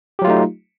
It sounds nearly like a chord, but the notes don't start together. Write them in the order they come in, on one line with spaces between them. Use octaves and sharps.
G4 F#3 F4 A3 D#4